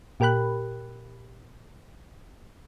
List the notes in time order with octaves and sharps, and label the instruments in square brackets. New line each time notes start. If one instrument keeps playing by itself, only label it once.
[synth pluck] A#2 G4 A#4 G5 B5 F#6